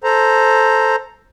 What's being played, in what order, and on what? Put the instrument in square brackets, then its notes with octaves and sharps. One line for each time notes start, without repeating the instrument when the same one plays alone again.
[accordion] A4 C5 A#5